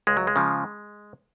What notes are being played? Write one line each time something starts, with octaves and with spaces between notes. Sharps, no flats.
C#2 G#3
F#3
G#3
C#3 F3